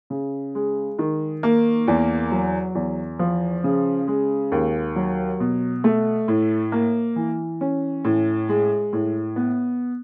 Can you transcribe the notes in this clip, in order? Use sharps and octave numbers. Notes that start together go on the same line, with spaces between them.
C#3
G#3
D#3
A#3
E2
F#3
E2
F3
C#3
G#3
D#2
F#3
B2
A3
A2
A#3
E3
C#4
A2
G#3
A2
B3